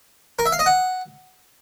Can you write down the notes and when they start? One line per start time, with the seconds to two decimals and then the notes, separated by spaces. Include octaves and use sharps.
0.39 A#4
0.46 E5
0.52 F5
0.59 D#5
0.66 F#5